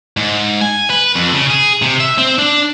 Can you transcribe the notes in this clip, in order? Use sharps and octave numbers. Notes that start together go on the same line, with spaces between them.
G#2
G#5
B4
F2
C#3
G#4
C3
E5
C4
D4